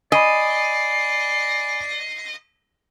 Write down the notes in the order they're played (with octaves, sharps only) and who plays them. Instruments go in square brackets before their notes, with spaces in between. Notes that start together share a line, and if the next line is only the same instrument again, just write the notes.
[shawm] D5 [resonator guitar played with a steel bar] D#5 [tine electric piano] G#5 B5 [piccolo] C7